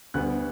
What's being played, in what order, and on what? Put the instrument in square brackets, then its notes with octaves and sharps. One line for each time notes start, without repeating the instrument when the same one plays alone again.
[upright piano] D2 D3 G3 B3 F#6